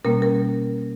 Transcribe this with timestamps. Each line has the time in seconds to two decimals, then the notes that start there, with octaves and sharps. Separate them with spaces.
0.04 B2 G3 A#3 C#4 A#4
0.22 A#4